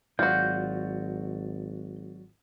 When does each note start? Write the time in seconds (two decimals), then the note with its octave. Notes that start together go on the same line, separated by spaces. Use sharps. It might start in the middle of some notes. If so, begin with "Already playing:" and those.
0.19 G#1 F#3 F4 F#4 D5 F#5 G6